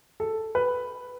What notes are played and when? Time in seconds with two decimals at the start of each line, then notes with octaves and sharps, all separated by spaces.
0.20 A4
0.55 B4